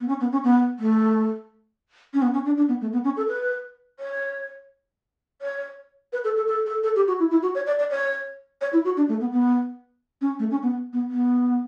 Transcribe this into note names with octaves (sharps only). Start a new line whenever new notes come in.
B3
C#4
B3
C#4
B3
A3
C#4
B3
C#4
D4
D4
B3
A3
B3
C#4
A4
B4
C#5
C#5
B4
A4
A4
A4
A4
A4
G4
F#4
E4
E4
F#4
C#5
D5
D5
C#5
C#5
E4
F#4
D4
A3
B3
B3
C#4
A3
C#4
B3
B3
B3